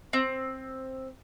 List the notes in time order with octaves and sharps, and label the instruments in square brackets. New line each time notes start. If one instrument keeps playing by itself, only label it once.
[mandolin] C4